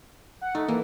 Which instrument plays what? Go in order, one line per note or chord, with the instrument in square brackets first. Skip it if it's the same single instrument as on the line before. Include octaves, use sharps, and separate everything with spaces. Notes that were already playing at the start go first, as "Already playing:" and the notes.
[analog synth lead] F#5
[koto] A3 [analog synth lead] D#4
[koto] E3 [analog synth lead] A#3